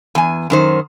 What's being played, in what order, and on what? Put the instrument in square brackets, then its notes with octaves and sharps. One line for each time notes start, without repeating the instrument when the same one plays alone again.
[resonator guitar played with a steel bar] E2 G#5
F#2 D#3 C5